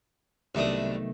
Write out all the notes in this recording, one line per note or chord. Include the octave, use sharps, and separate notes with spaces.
C2 C3 D#3 F#3 A3 B3 D4 D#6